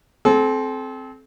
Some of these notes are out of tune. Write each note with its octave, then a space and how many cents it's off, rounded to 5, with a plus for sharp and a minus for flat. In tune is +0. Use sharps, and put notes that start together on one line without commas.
C4 +0 A4 -35